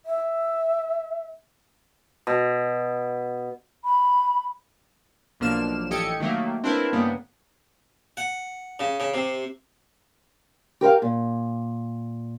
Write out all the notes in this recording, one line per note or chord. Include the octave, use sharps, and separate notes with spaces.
E5
B2
B5
B1 F3 A#3 D4 F6 E7
A1 G4 A4 D#5 G#6 C#7
D#3 F#3 A3 A#3
C4 D4 E4 A#4 B4
G2 C#3 A#3 B3
F#5
C#3
C#3
C3
G4 A#4 C5 F5
A#2